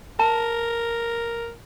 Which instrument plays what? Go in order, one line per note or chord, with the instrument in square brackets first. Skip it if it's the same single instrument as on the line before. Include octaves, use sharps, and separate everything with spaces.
[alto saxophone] A#4 [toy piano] A5